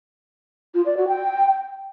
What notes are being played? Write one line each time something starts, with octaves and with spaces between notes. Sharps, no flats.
F4
D5
F#4
G5